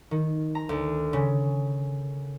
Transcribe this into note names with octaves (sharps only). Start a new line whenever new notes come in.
D#3
A#5
D2
C#3